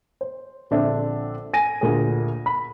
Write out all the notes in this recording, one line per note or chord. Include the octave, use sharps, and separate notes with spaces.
C5
A#1 D3 C4 D4 E5
G#5 A#6 D#7
D2 A#2 G#4
B5